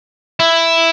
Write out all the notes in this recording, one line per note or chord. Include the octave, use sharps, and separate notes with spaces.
E4